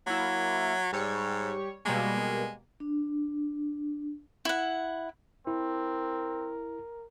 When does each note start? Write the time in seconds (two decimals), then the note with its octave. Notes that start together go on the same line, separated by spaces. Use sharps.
0.07 F#3 A#3 E4
0.93 G#2 G3 C#5
1.85 B2 G3 G#3 A#3
2.80 D4
4.45 E4 F#5
5.47 C4 E4 A#4